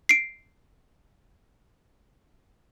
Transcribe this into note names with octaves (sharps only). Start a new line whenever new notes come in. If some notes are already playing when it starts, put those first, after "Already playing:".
C7 D7